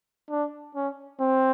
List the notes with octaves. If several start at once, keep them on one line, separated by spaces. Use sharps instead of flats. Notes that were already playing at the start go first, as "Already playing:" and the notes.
D4
C#4
C4